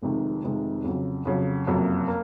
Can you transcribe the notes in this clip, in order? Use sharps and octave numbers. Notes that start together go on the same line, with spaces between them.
F1 F2 C3 D#3 G#3
F1 F2 C3 D#3 G#3
F2 C#3 F#3
F2 C#3 F#3
F#1 F2 C3 F#3 A#3
A#3